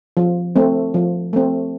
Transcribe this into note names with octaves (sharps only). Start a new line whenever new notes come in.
F3
A3 C4
F3
A3 C4